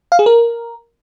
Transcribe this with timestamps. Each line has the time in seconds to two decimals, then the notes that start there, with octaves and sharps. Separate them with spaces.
0.12 F5
0.19 G#4
0.26 A#4